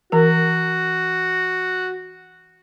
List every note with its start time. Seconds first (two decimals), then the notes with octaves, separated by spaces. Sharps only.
0.12 E3 F#4 A#4